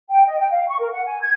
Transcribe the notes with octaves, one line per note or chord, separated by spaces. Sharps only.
G5
D#5
G5
F5
C#6
A#4
F#5
G#5
G#6